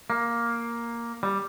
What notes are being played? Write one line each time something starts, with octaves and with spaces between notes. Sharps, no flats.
A#3
G3